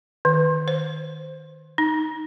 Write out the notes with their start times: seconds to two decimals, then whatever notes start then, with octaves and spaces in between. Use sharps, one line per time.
0.25 D#3
0.68 C5
1.78 D#4